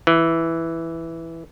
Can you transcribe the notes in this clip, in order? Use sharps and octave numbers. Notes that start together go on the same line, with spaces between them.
E3